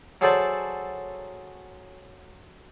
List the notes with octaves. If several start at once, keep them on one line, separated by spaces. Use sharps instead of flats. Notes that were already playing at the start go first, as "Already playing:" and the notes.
F#3 G#4 A4 C5 D5 G#5